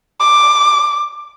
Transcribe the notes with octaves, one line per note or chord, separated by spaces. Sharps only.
D6